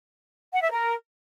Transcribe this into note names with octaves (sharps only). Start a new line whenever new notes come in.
F#5
E5
A#4